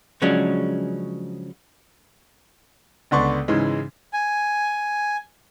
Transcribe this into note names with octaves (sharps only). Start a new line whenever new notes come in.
C#3 F3 F#3 G#3 C#4 D4
C#2 D3 B3 D5 C6 C#6
G#2 C#3 E3 G#3
G#5